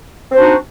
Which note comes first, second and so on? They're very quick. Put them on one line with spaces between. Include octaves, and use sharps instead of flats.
C4 C5 D4 F#4 D#4